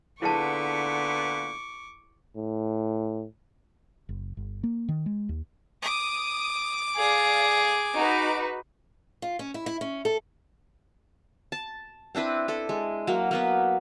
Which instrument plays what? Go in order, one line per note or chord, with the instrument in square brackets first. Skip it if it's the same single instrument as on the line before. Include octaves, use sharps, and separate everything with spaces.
[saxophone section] A#2 B3 [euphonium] D3 [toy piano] E4 G#4 A5 [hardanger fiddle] C#6 D6
[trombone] A2
[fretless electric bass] F#1
G1
A#3
D#3
G#3
D#2
[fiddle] D6 [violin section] D#6
[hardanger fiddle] G#4 [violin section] D5 F5
[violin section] D#4 F#4 B4
[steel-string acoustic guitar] F4
C#4
E4
E4
C#4
A4
[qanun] A5
C4 D4 E4 B4
E4 A4
G#3
F#3 A#3
A#3 B3 B4